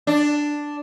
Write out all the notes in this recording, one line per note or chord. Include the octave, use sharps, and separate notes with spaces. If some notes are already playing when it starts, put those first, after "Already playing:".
D4